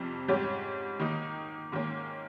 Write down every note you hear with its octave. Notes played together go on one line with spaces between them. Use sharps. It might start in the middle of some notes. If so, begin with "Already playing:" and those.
Already playing: F2 C3 G3
G#2 G3 C#4 G4 C#5
D#3 A#3 D#4
G#2 D#3 A#3 C#4